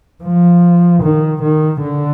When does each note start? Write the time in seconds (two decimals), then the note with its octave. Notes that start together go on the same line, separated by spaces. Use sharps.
0.24 F3
1.03 D#3
1.42 D#3
1.83 D3